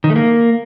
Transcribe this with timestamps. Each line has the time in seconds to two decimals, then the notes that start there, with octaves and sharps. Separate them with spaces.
0.04 D#3
0.10 A3
0.16 A#3